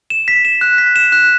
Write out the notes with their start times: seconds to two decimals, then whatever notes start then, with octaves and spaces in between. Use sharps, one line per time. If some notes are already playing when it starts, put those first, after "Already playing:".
0.10 E7
0.28 B6
0.45 E7
0.61 F#6
0.78 B6
0.96 E7
1.12 F#6